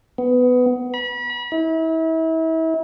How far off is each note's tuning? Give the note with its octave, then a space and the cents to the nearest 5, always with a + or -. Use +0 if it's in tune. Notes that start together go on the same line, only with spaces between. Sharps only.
B3 +15
B5 -35
E4 -35